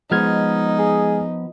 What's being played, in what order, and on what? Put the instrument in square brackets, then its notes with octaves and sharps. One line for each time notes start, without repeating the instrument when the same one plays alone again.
[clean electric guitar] F3 B3 [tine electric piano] G#3 F6 G#6 [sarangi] D#4
[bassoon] G#4